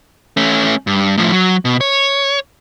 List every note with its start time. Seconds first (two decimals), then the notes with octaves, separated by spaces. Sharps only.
0.37 A3 C#4
0.87 G2
1.17 A2 F3
1.32 F#3
1.65 B2
1.81 C#5